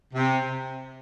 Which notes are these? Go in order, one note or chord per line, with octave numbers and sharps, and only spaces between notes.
C3